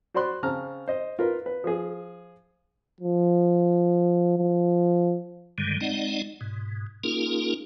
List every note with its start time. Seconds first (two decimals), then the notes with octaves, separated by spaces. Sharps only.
0.14 F#4 C5 D5 B5 C6 F#6
0.43 C#3 C4 A5 A#5 F6
0.88 C5 D#5
1.19 F4 A#4 B4
1.46 B4
1.64 F3 G#4
3.01 F3
4.38 F3
5.58 G2 D3 D#3 G3 G#3
5.81 G#3 C4 D#4 D5 D#5 F#5
6.41 G#2 B2
7.04 A#3 C#4 D#4 F4 G#4 A#4